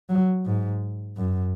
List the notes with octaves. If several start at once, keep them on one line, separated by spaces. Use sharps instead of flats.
F#3
G#2
F#2